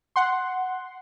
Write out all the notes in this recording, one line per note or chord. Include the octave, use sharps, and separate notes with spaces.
F#5 C6